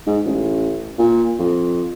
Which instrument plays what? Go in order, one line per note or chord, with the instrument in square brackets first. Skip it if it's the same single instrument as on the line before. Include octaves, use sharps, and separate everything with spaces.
[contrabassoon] G#2
A1
A#2
F2